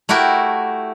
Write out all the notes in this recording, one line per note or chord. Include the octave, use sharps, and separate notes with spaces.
A3 E4 F#4 G4 A#4